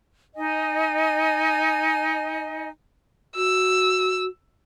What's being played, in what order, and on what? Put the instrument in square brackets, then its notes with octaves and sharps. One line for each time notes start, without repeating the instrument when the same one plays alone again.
[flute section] D#4 D#5 G#5
[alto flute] F#4 [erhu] E6